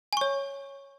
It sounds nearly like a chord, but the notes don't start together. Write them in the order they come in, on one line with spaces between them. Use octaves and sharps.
G#5 C#6 C#5